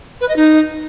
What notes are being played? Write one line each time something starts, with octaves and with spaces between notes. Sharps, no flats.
B4
D#5
D#4